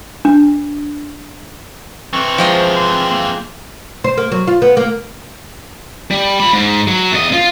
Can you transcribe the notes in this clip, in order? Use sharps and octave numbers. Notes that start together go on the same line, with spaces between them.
D4
E3 C4 C#6
F3 G#3 G5
C6
A#3
C5
A#3
F#3
F4
B3
A#3
G3
F3 B5
G#2
F#3
E2 D#5
F4